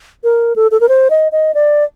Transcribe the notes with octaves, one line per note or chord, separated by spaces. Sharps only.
A#4
A4
A4
A#4
C5
D#5
D#5
D5